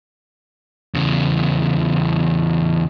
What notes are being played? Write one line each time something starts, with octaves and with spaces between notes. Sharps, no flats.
E2 C#3